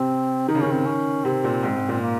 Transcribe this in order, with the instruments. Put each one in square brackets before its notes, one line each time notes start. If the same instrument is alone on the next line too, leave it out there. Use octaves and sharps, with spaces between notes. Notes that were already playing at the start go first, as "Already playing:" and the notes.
Already playing: [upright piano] C3 [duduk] C4
[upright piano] D#3 [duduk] D#4
[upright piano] C#3
[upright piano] D#3 [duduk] C#4
[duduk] C4
C#4
[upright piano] C3 [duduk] C4
[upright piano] A#2
G#2
G#2
[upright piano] A#2 [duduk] C4
[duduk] A#3